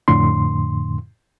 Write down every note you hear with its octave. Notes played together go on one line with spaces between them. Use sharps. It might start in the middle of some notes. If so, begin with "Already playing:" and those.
F2 A2 D3 C6